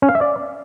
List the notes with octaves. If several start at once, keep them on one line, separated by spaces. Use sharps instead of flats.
C#4
F5
E5
D5